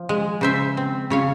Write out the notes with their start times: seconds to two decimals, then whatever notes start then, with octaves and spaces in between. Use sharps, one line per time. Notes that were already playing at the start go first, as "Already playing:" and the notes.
Already playing: F3
0.09 G#3
0.41 C#3 C5 E5
0.77 C4
1.10 C#3 C#5 F5